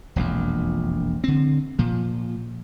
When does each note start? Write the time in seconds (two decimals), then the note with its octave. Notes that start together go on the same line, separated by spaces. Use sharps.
0.16 E1 A#1 F2
1.24 D3 C4
1.79 A#2 F3